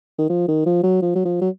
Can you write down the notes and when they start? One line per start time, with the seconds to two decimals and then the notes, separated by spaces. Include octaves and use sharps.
0.19 D#3
0.30 F3
0.48 D#3
0.66 F3
0.84 F#3
1.02 F3
1.15 F#3
1.25 F3
1.42 F#3